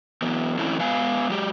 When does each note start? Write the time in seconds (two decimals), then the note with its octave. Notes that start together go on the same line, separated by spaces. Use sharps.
0.22 E3 F#3 B3
0.58 E3 F#3 A3 C4 C#4 E4
0.79 G#3 B3 F5 G#5
1.30 F#3 G#3 G4